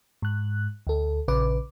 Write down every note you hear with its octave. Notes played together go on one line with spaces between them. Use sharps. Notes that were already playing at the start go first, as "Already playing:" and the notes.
G#2 F#6
D2 A4
A#1 C#3 B4 D6